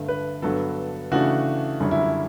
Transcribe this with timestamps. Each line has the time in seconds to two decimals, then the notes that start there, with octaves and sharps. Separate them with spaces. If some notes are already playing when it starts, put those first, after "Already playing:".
Already playing: G2 D3 A3 D4
0.08 B4
0.42 G2 D3 F#3 B3 D4 A4
1.11 C#3 E3 A3 D4 F#4
1.80 F#2 D3 G3 C#4
1.91 E4
2.03 E4